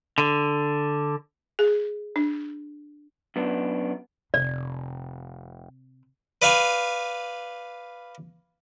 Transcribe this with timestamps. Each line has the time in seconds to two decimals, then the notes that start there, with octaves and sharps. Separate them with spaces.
0.18 D3
1.59 G#4
2.16 D4
3.36 F#2 B3 D4
4.34 F1 C3 D5
6.42 B4 D5 F5 G#5 B5